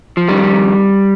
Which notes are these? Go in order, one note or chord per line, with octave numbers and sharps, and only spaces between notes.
F3
F2 D#3 G3